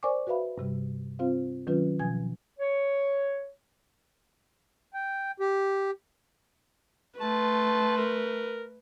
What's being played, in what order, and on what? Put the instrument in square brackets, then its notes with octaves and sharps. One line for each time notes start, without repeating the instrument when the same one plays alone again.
[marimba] A#4 C5 D5 G#5 C#6 D6
F#4 B4 E5 F5 B5
G2 C3 G3
C4 F4 C5 F5
D#3 F#3 C#4 F4 B4
B2 F3 G#5 G#6
[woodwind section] C#5
[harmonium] G5
G4
[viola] A3 [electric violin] B4 [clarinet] A5 [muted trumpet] C6
[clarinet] A#4